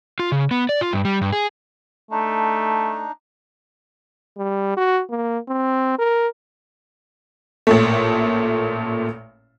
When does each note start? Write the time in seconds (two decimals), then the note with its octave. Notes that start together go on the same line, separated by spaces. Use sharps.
0.19 F4
0.32 C#3
0.51 B3
0.69 D5
0.81 F4
0.93 G2
1.05 G3
1.21 G2
1.33 G#4
2.11 A3 D4 D#4
4.37 G3
4.77 F#4
5.10 A#3
5.48 C4
5.99 A#4
7.67 A1 A#2 A3